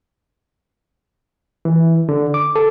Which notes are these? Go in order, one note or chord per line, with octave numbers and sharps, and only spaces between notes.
E3
D3
D6
A4